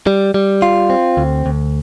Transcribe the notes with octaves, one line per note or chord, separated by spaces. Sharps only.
G3
G3
F4
C4
D2
D2